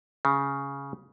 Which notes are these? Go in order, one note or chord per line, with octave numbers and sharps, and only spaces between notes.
C#3